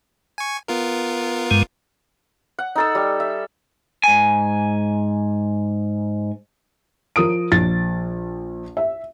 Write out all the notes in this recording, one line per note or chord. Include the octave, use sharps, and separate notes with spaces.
G#5 C#6
B3 F4 A#4
G2 G#3
F#5
D#4 A4 E6
G3
E5
G#2 G#5
F3 A#4 D#6 D7
A#1 A6
E5